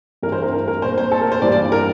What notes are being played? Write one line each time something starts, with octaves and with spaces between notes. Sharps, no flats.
G2 E3 A3 C4 A#4
C5
A#4
A#4
A#4
A#2 A3 C4 C5
C5
A4
A#4
C5
G2 E3 G3 A#3 D5
D5
A#4